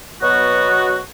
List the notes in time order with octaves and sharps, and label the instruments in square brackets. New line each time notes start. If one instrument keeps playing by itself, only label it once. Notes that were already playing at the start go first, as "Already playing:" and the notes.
[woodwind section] B2 F#3 B3 F#4